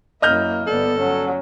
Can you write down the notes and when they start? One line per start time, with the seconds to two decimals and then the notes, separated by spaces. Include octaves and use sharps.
0.22 F#2 A#3 E4 D#5 F6 G6
0.67 G1 B3 A4 D5
1.00 F#3 C#4